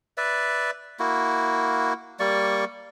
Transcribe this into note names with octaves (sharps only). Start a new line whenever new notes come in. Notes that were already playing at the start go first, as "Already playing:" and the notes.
B4 D5 E5
A#3 E4 F#4
G3 A#3 D5 C#6